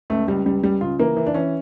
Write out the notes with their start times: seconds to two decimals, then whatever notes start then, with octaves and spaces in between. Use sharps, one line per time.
0.10 C#2 A3
0.28 C#2 G3
0.45 C#2 G3
0.63 C#3 G3
0.81 C#3 F4
0.99 E3 A#3
1.17 E3
1.27 D4
1.34 E3 C#4